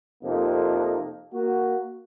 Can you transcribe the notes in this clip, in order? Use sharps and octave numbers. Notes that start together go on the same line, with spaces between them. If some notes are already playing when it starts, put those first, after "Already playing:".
F2 C3 A#3 D#4 A4
A#3 F#4